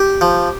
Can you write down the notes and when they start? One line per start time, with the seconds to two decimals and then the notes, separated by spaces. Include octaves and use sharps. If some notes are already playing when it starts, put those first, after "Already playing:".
Already playing: G4
0.21 F3